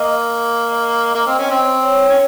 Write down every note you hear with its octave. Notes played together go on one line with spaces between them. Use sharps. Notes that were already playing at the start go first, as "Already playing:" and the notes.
Already playing: A#3 D#5
D#5
A#3 D#5
C4
C#4
C4
C#5
C#4